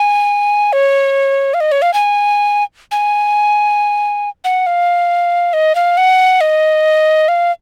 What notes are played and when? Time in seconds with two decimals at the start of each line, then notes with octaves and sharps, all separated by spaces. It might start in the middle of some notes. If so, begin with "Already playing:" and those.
Already playing: G#5
0.73 C#5
1.54 F5
1.60 D#5
1.72 C#5
1.82 F5
1.94 G#5
2.92 G#5
4.44 F#5
4.66 F5
5.53 D#5
5.75 F5
5.97 F#5
6.41 D#5
7.28 F5